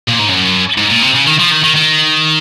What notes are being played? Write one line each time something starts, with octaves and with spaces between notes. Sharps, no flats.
A#2
G#2
F#2
G#2
A#2
C3
C#3
D#3
F3
D#3
D#3
D#3